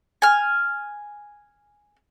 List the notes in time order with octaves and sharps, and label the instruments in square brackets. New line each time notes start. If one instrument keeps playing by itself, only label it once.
[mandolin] G#5 F6